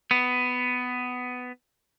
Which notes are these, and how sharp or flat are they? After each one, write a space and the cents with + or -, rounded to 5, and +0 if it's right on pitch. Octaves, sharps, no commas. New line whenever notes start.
B3 +15